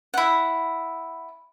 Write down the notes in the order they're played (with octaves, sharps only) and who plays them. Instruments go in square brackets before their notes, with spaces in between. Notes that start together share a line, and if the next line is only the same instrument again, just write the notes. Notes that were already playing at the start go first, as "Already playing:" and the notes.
[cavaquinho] E4 F#5